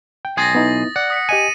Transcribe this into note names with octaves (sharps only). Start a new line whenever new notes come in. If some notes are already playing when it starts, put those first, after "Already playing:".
G5
B1 G#5 C6 D#6 A6 A#6
B3 D#4 E4
D5 F#5
D#6 B6 C#7
G4 D#5 G#5 D#7